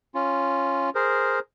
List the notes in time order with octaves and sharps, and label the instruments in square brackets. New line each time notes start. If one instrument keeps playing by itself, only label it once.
[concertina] C#4 F4
G#4 A#4 C5